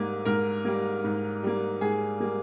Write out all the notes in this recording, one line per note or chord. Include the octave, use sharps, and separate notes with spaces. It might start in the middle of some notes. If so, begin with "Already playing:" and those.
Already playing: G#2 G3 A#3
G#2 A#4
G3 A#3
G#2
G3 A#3
G#2 G#4
G3 A#3